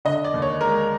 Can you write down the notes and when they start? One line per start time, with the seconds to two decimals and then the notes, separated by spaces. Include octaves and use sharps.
0.05 D3 D#5
0.24 D5
0.34 D#2
0.42 C#5
0.61 G#3 A#4